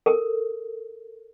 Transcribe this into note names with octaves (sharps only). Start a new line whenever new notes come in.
A4 A#4